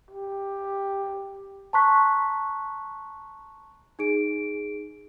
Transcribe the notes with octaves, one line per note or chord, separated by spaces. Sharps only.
G4
A5 A#5 C6 C#6 F#6 B6
D#4 G#4 D7